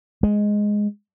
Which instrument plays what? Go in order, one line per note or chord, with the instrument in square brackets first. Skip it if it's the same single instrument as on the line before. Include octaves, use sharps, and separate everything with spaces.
[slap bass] G#3